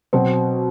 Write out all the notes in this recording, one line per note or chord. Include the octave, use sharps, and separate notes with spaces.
B2 F#3 C4